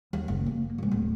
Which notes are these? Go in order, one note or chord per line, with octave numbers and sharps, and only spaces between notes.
D#2
F#1
A#3
F#1 G#2
D1